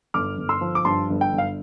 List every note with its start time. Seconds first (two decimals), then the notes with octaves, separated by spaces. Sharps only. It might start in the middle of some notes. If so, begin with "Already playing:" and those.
0.14 G1 D6 F6
0.37 G1
0.49 C6 E6
0.61 F3
0.75 D6
0.85 G2 A5 C6
1.09 G1
1.21 G5
1.33 G1
1.38 F5